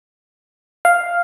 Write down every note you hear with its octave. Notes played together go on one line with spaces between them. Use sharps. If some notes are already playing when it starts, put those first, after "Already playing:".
F5